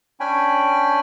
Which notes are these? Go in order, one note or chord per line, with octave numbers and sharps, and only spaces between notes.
C#4 D4 G5 G#5 B5